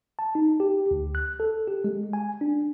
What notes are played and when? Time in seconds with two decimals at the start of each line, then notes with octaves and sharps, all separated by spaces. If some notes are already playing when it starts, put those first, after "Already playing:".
0.19 A5
0.35 D#4
0.60 G4
0.91 D2
1.15 F#6
1.40 A4
1.67 G4
1.84 G#3
2.13 G#5
2.41 D4